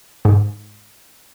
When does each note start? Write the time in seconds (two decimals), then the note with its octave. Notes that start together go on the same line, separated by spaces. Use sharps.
0.25 G#2